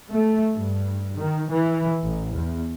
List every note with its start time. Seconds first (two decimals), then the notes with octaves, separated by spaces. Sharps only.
0.11 A3
0.54 G2
1.17 D#3
1.51 E3
2.03 A1
2.33 E2